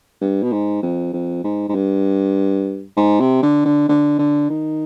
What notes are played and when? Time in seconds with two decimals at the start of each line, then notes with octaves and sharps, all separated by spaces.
0.21 G2
0.43 B2
0.52 G#2
0.83 F2
1.13 F2
1.44 G#2
1.69 G#2
1.75 G2
2.96 G#2
3.20 C3
3.42 D3
3.65 D3
3.89 D3
4.18 D3
4.50 D#3